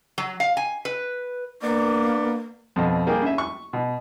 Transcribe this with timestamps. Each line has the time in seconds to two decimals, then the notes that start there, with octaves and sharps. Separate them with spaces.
0.18 F#3
0.40 F5
0.57 G#5
0.85 B4
1.62 A#3 B3 D4 D5
2.76 F2 B2
3.07 G3 A#3 G4 G#4
3.22 C#4 E5
3.38 C#6
3.73 B2